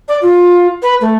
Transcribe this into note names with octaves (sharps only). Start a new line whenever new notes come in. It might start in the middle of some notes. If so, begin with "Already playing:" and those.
D5
F4
B4
A3